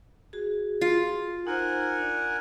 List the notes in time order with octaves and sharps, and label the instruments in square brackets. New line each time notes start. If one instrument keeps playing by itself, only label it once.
[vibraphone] F#4 G#4
[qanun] F4
[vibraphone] D#4 C5 [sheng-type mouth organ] A#4 F#5 G#5
[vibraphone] D4 D5